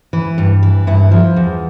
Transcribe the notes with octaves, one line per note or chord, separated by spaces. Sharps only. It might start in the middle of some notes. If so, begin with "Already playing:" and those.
E3
G2
E3
G2 E4
F3
E2